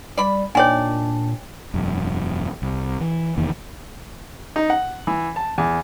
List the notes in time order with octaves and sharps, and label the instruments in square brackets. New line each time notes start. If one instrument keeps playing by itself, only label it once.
[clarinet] G3 [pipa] D5 B5
[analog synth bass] A#2 [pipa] D#3 D5 [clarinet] D4 [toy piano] C#5 G5 G#5
[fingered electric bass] E1 F#2
C2
E3
F1 E2 D#3 A#3
[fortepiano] D#4
F#5
E3
A5
E2